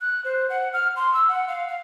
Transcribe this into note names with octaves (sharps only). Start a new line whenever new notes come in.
F#6
C5
F#5
F6
C6
E6
F#5
F5
F5